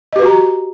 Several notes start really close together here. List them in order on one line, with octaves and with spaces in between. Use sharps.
D#5 G4 B4 F#4 A#5